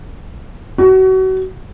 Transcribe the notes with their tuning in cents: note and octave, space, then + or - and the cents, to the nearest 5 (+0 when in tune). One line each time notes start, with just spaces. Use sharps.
F#4 +30